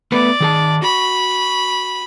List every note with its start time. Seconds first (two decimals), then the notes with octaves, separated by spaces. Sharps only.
0.12 A3 B3 B4 D5
0.40 D#3 G#4 A5
0.82 F#4 B5